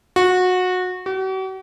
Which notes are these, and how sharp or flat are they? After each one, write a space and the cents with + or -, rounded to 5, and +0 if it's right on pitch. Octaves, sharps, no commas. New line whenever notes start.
F#4 -20
F#4 +45